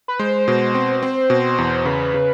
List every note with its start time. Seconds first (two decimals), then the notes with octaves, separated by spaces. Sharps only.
0.08 B4
0.19 G#3 C5
0.48 B2
0.75 C4
1.03 C4
1.30 B2
1.58 E2
1.85 C#3 B4
2.14 C#3